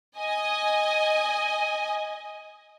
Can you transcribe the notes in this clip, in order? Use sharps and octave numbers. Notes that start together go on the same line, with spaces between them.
D#5 G#5